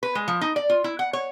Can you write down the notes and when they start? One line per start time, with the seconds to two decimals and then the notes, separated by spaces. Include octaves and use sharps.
0.03 B4
0.15 G#3
0.28 F3
0.41 D#4
0.56 D5
0.70 F4
0.84 E4
0.99 F#5
1.13 C#5